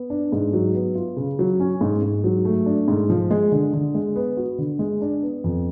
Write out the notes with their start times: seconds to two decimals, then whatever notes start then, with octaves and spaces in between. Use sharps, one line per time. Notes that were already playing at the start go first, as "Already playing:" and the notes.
Already playing: B3
0.10 D4
0.32 G#2
0.53 F#3
0.74 B3
0.95 F4
1.16 C#3
1.39 F#3
1.60 C#4
1.81 G#2
2.02 G#2
2.24 F#3
2.45 A3
2.66 D4
2.88 G#2
3.10 F3
3.31 G#3
3.52 D3
3.73 D3
3.94 G#3
4.16 B3
4.37 F#4
4.58 D3
4.79 G#3
5.01 D4
5.22 B3
5.44 F2